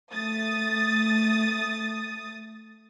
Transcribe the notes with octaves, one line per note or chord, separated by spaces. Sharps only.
A3 D#6 A6